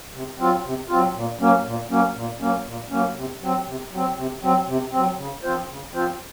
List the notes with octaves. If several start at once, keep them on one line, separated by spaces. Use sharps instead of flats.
C3
F#3 C4 F4
C3
F#3 C4 F4
A#2
F#3 A#3 C#4
A#2
F#3 A#3 C#4
A#2
F#3 A#3 C#4
A#2
F#3 A#3 C#4
C3
F#3 C4
C3
F#3 C4
C3
F#3 C4
C3
F#3 C4
C#3
F3 C4 F4 C5
C#3
F3 C4 F4 C5